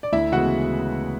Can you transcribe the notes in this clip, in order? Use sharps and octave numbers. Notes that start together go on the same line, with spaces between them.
D5
D2 E4 E5
C#3 E3 G#3 B3 F#4 F#5